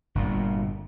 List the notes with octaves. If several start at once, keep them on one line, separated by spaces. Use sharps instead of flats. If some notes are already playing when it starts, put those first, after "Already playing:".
G1 A#2